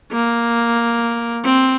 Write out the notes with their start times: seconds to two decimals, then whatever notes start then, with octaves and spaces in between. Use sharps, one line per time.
0.12 A#3
1.44 C4